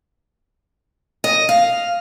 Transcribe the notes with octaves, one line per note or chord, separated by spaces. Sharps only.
D#5
F5